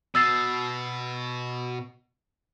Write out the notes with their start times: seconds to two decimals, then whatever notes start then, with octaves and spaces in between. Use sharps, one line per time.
0.15 B2 E6 A6 C7